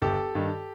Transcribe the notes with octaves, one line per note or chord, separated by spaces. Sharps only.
G1 G4 A4
G2 D#3